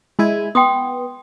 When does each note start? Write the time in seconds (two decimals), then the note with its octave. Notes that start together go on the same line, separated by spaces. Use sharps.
0.19 G#3 E4 G#5
0.55 B3 G5 C6 D#6